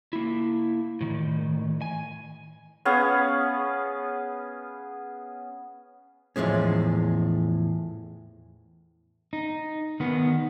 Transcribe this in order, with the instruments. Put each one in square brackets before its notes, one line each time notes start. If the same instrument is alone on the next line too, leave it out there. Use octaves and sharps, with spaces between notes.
[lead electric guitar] A#3 E4
A2 D#3
G#5
[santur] B3 C#4 G#4 F5
[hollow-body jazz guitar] E2 A2 F3 G#3 C#4
[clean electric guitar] D#4
D#3 B3